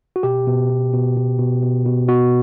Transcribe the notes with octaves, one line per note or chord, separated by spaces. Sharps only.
F#4
B2 G4
B2
B2
B2
B2
B2
B2
B2
B2 F#4